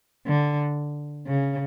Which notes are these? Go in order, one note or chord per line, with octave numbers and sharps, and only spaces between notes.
D3
C#3